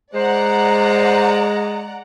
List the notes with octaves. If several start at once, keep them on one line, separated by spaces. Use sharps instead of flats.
G#3 C5 D5 F#5 A#5